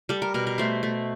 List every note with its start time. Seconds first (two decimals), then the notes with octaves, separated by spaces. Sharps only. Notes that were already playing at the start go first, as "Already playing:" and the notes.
0.09 G3 A4
0.22 A#4
0.34 B2 A#4
0.47 A#4
0.58 A3 C5
0.83 A3